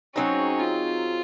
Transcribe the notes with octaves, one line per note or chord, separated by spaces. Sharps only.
F#3 C4 C#4 D#4 G#4
F4